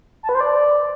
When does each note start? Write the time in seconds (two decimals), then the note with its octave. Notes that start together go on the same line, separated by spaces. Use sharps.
0.23 A5
0.29 B4
0.35 C5
0.41 D5